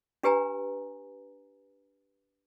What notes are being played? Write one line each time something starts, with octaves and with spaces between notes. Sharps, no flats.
D4 G4 B4 G#5 A#5